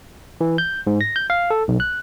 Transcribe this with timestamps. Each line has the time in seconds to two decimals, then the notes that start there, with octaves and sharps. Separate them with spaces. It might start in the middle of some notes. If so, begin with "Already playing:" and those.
0.41 E3
0.58 G6
0.87 G#2
1.01 A#6
1.16 G6
1.30 F5
1.50 A4
1.68 B1
1.80 F#6